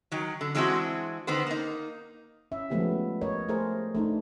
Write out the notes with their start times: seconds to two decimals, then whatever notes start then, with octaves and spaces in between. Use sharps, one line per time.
0.12 D#3 F#3
0.41 D3
0.55 E3 G#3 C4 D4 E4 F#4
1.27 D3 D#3 B3 C5
1.47 A#3 D#4
2.52 C#4 E5
2.70 F3 G#3 A3 B3 C#4 G4
3.21 A#4 C#5 D#5
3.48 A3 G#4 A#4 C5
3.95 A3 D4 D#4